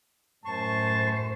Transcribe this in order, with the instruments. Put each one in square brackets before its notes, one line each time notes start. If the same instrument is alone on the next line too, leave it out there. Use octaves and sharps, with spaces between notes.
[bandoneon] F#2 C#6 [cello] A2 C5 [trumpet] A5